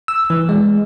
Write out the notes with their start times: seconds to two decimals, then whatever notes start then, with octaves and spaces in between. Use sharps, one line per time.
0.08 E6
0.30 E3
0.49 G#3